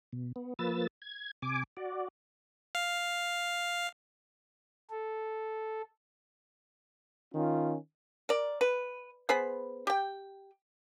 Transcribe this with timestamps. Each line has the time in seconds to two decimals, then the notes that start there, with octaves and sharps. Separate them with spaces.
0.13 B2
0.36 B3
0.59 F3 A#3 B4 E6 A6
1.02 G#6
1.42 C3 G#5 D6
1.77 F#4 D5
2.75 F5
4.90 A4
7.34 D#3 C#4 F4
8.29 A#4 D5
8.61 B4
9.29 B3 G#4 C5 B5
9.87 G4 G5